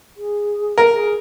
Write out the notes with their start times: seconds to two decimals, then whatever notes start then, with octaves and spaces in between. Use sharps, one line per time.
0.17 G#4
0.78 A#4
0.93 G#4